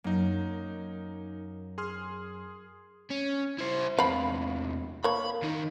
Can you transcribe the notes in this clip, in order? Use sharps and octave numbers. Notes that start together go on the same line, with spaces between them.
F#2 A#3 D#4
G#4 C6 F6
C#4
E4 C5
E2 C3 F5 B5
A#3 C#5 B5
D#2 D#4